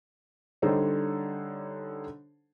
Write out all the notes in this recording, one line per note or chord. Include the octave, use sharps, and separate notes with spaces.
D3 G3 D#4 A4 C5 C#5